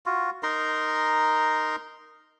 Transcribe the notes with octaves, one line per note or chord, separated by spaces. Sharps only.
F4 F#4
D#4 A#4 A#5 C6